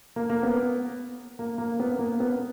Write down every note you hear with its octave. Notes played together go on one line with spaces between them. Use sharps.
A#3
A#3
B3
A#3
A#3
B3
A#3
B3